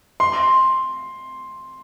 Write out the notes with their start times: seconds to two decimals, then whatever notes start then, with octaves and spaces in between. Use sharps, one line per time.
0.20 C6